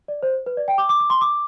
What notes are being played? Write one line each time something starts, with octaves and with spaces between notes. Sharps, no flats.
D5
C5
B4
D5
G5
D6
D6
D6
C6
D6